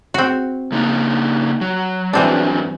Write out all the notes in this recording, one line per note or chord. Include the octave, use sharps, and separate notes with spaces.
C4 F#4
C#3 A#3 D#4
F#3
G2 E3 F#3 C4 D4